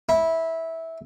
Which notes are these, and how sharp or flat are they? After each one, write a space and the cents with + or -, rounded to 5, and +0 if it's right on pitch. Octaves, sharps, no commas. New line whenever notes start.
E4 -15